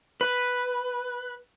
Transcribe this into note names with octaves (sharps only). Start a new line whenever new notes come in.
B4